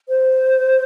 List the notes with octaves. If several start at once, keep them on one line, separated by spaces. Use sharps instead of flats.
C5